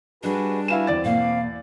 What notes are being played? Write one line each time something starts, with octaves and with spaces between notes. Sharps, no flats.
G3 D4 F#4 G#4 B4 D#5
E4 F#4 B4 F5 G#5 E7
E2 C4 D5 A6
B2 A#3 F5